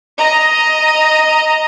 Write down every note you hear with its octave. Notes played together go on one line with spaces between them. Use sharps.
D#5 A#5